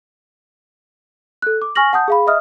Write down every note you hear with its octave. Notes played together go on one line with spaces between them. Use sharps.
A4 F#6
D6
G#5 C#6 F6 A#6 F#7
F#5 A5 D#6 G6
G#4 F5 B5
D#5 E5 D#6 F6